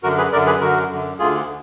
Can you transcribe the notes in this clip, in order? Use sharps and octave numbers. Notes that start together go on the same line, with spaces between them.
F#2 D3 F#4 A#4
G#4 B4
F#2 D3 A#4 D5
G#4 B4
F#2 D3 F#4 A#4
F#2 D3
D2 D3 F4 G#4